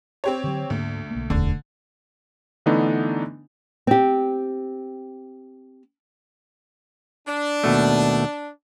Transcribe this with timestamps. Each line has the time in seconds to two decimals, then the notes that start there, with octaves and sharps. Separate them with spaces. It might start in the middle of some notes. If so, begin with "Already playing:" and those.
0.24 C4 G4 C#5
0.44 D3 F#3
0.70 D2 G#2 A#3 B3
1.11 B1 A#3
1.30 E1 D2 D3 A3 D4
2.66 D3 E3 A3 B3 D4 D#4
3.87 C4 G4
7.27 D4
7.64 D#2 B2 A3